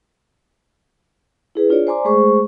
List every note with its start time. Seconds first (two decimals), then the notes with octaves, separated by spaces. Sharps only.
1.55 E4 G#4 B4
1.70 D4 F4 G#4 C#5 D5
1.87 C5 D5 G#5 A#5 C6 D6
2.05 G#3 A3 G#4 C5 C#6